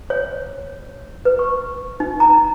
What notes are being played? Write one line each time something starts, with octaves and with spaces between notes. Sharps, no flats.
C#5
B4
C#6
D#4
A#5